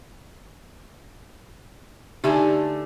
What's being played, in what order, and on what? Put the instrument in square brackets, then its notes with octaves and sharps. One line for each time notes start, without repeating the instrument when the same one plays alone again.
[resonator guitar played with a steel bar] D3 A3 G#5 [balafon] D#4 G4 E5